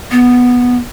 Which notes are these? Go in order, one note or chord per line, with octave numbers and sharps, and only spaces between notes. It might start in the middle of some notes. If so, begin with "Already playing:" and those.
B3